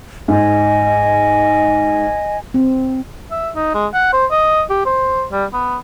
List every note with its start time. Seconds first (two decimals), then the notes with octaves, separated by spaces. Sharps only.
0.28 G#2 D#5 G#5
2.54 C4
3.31 E5
3.56 D#4
3.74 G#3
3.94 F#5
4.13 C5
4.31 D#5
4.70 G4
4.86 C5
5.32 G3
5.53 B3